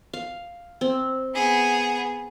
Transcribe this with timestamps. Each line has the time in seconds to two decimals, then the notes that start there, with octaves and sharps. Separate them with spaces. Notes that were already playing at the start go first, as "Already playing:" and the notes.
0.13 F5
0.81 C4
1.35 B3 G#4